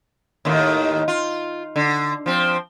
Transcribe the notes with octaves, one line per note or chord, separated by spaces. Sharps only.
D#2 A2 D#3
F4
D3
F3 C4